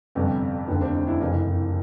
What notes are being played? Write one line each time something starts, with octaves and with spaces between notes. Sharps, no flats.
G1 F2 C3 B3 C#4
F1 D#2 D3 B3 C#4
C4 D4
C#4 D#4
D4 E4
F#1 F2 C3 E3 D#4 F4